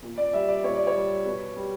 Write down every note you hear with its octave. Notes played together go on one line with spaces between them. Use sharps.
A#2
D5
G3 E5
D5
A#2 C#5
D5
C#5
G3
B2
G3